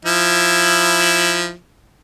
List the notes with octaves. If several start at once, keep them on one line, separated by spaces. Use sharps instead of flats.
F3 E4